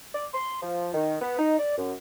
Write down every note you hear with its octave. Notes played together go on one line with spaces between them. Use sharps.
D5
C6
F3
D#3
B3
D#4
D5
F#2